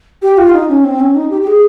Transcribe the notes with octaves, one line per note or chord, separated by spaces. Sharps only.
G4
F4
D#4
C#4
C4
C#4
D#4
G4
G4
G#4